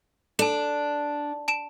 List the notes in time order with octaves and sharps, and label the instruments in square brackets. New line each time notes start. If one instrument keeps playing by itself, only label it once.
[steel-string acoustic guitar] D4 [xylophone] A4 A5
[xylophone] A5 D7 E7